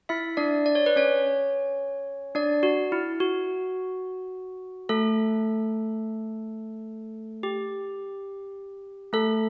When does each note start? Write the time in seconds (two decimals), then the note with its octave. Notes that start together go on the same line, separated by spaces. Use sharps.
0.09 E4 E5
0.37 D4 D5
0.66 D5
0.75 C#5
0.86 B4
0.96 C#4 C#5
2.35 D4 D5
2.63 F#4
2.92 E4
3.20 F#4
4.89 A3 A4
7.43 G4
9.13 A3 A4